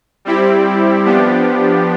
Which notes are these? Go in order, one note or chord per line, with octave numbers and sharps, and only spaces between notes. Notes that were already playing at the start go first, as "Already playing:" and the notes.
G3 C4 E4 G4
F3 B3 D4 G4